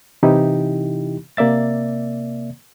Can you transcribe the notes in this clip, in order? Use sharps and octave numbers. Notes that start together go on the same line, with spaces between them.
C3 E3 D#4 E4 G4
C3 A#3 D5 E5 A6